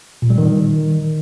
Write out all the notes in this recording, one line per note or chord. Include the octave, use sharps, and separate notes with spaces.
A#2
G3
D#3